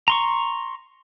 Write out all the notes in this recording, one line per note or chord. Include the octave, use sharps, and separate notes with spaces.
A#5 C6 C#6